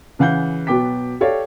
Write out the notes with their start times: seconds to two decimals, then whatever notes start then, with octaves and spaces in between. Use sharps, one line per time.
0.19 C#3 E3 F5 F#5 G6
0.67 B2 F#3 B3 G5 D6 B6
1.21 G4 A4 C#5 D5 F5